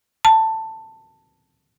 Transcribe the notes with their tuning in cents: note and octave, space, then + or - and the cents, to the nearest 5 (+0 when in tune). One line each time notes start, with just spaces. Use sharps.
A5 +15